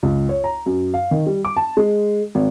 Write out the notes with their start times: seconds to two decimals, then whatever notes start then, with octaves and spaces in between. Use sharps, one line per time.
0.03 C#2
0.29 C#5
0.44 A#5
0.66 F#2
0.94 F5
1.11 D#3
1.27 G3
1.45 D6
1.56 A5
1.77 G#3
2.35 G#1